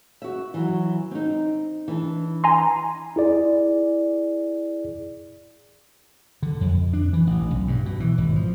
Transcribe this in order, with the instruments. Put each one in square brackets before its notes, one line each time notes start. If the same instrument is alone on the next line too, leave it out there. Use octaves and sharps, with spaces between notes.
[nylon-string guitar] F#4 E5
E3 F#3 F#4
C4 D#4
E3 D4
[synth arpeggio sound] G#5 A#5 C6
[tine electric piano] E4 G#4 D5
[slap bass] D3
F2
D4
E3
A1
B1
G2
B2
E3
G#1
F3